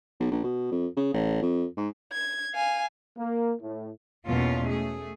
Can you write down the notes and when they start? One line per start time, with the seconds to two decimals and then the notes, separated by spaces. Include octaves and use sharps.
0.20 B1
0.31 A#1
0.43 B2
0.72 F2
0.96 C#3
1.14 A1
1.42 F2
1.77 G#2
2.13 G#6
2.54 F5 G#5
3.17 A#3
3.61 A2
4.25 E2 B2 G#3 A#3 C#4 F4
4.65 A3 G#4